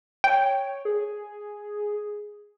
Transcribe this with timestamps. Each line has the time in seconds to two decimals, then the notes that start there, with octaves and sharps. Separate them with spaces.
0.24 C#5 G5
0.85 G#4